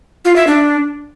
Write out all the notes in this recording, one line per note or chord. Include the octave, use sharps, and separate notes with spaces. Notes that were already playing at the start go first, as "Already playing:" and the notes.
F4
E5
D4